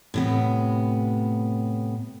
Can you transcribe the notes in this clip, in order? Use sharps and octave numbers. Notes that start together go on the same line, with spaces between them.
A2 C3 B3